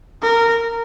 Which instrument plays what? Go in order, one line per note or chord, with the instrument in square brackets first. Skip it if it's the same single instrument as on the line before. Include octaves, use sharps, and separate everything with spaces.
[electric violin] A#4